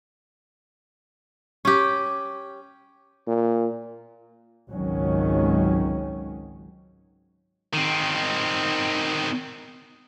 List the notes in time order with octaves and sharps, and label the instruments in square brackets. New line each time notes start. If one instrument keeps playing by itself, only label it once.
[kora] C#4 G4
[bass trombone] A#2
[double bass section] G#1 C#2 D#3 F#3 C#4
[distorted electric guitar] D#3 C4